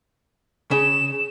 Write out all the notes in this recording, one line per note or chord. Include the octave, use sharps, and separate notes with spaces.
C#3 E7